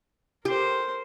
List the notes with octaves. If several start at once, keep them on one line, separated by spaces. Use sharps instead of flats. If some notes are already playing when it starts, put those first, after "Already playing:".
G4 A#4 C5